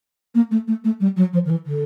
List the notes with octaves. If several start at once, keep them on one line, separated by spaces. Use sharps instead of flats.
A#3
A3
A3
A3
G3
F#3
F3
D#3
E3
D3